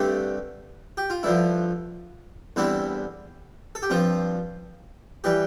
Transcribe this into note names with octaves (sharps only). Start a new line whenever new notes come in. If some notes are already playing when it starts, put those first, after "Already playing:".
Already playing: G2 D3 A3 C4 G4
G4
F4
G2 D3 F3 E4
E2 D3 G3 C4 E4
A4
G4
G2 F3 C4 F4
E3 G3 G4